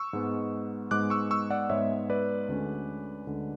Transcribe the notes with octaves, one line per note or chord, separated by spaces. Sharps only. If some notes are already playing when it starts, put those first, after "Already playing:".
Already playing: C#6 E6
G#2 G#3 B3
G#2 G#3 B3 D6 F#6
C#6 E6
C#6 E6
D5 F#5
G#2 G#3 B3 C#5 E5
B4 D5
D2 D3 G#3 C#4
D2 D3 G#3 C#4